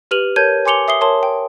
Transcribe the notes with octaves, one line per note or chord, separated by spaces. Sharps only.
G4 B4 F6 D#7 F7 F#7
A#4 C#5 A5 G6 G#6 D#7
G#5 C6 D6 C#7 F7 G7
E5 D#6 C7 G7
A#4 C#5 A5 C6 G7
G5